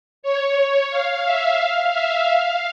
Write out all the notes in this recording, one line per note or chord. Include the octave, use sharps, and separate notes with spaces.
C#5
F5
E5
F5
E5
F5